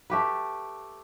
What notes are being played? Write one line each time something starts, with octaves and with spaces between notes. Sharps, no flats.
A3 G4 B4